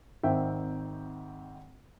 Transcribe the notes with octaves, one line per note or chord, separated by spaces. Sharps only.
G#1 D#3 C4 E5 G5